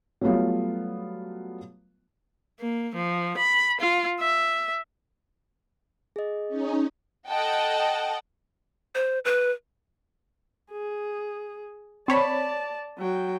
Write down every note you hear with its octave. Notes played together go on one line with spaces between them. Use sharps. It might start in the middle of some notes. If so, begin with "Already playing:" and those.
F#3 G3 A3 B3 F4
A#3
F3
B5
F4
E5
G#4 D#5
C#4 D#4
A4 D#5 F#5 G5 A5
C5
B4
G#4
C4 C#5 D5 A5 B5
F#3 G5